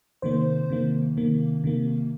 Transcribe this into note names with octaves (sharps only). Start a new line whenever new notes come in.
C3 D#3 A#3 C5
C3 D#3 A#3
C3 D#3 A#3
C3 D#3 A#3